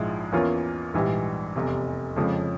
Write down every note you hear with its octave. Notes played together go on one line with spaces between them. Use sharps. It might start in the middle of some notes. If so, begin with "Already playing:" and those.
Already playing: A#1 G#2 F3 G#3 E4
E2 E3 A#3 C#4 F4
A#1 G#2 E3 G3
F1 E2 C3
F2 C#3 F3 G#3